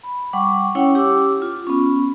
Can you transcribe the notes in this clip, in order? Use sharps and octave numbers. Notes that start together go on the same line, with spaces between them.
B5
G3 F#5 C#6 D6
C#4 E4 C#5 F#5 G5
G4 D6 E6
F4
B3 C#4